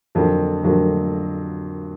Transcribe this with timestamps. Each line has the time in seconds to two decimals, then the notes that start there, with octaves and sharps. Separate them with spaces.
0.15 F2 D3 F#3 A#3
0.64 F2 D3 F#3 A#3